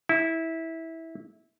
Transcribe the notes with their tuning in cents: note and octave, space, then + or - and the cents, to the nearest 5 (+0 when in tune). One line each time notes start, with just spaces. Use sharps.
E4 -15